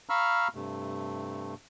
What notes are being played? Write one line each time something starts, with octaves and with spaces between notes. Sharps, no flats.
F5 A#5 B5 C#6 E6 F6
G2 C3 A3